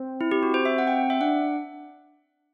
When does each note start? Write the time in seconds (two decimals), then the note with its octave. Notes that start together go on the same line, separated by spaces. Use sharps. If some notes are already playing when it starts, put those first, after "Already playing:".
Already playing: C4
0.21 E4
0.31 G4
0.43 F#4
0.54 C5
0.65 E5
0.78 F#5
0.87 G5
1.10 E5
1.21 D4 F#5